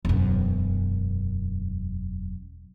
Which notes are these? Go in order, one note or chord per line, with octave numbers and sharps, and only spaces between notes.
E1 F#2